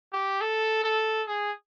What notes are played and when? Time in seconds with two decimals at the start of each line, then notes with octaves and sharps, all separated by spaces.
0.13 G4
0.41 A4
0.84 A4
1.27 G#4